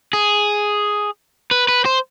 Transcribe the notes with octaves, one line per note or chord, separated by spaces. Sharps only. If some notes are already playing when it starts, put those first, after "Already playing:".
G#4
B4
B4
C5